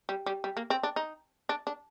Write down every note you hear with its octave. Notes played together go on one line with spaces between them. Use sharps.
G3
G3
G3
A#3
C4
D4
D#4
D4
D4